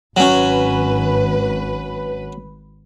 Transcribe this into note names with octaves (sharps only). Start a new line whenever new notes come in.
G#1 F#3 C#4 B4